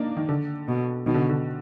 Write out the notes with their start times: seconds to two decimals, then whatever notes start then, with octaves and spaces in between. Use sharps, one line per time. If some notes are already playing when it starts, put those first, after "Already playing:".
Already playing: A#3 D4 D#4
0.17 D#3
0.29 D3
0.68 B2
1.06 B2 D#3
1.14 D3
1.29 D3